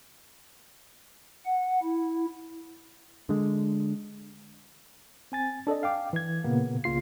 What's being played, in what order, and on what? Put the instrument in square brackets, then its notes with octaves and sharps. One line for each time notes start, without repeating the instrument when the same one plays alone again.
[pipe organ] F#5
E4
[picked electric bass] D3 G#3
[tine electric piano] C4 G#5 A6
D4 A4 D5 D#5
F5 G5 D6
E3 G#6
A#2 C#3 A#3 B3
C2 C#3 A#3 F4 C7